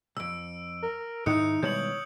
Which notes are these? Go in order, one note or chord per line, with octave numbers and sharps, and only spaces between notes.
B1 F2 E6 D7
A#4
G#2 D#3 D#4 E4 D#6 F#6 C#7
B2 G3 G#3 C#5 G6 C#7 F#7